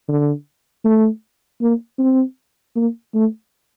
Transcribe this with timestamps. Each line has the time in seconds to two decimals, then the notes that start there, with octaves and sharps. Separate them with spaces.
0.08 D3
0.85 A3
1.61 A#3
1.99 C4
2.76 A#3
3.14 A3